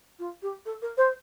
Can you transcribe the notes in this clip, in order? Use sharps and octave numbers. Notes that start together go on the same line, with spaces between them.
F4
G4
A4
A#4
C5